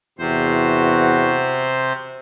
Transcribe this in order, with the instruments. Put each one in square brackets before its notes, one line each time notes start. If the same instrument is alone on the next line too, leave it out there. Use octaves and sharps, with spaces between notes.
[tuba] E2 [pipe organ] C3 C5 [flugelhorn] F#4